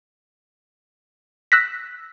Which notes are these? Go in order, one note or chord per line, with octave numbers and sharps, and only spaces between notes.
E6 F#6 A#6 B6